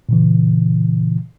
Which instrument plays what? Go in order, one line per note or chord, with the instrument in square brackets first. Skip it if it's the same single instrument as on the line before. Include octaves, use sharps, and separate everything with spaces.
[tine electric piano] A#2 C#3 E3